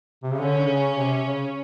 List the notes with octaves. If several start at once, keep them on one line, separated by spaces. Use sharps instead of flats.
C3
C#3
D3 C#4
D3
C#3
C3
C#3